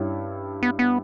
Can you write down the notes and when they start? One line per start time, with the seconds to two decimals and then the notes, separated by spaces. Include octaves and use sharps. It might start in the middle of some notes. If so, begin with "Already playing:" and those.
Already playing: G2 G3 C#4 E4
0.63 B3
0.79 B3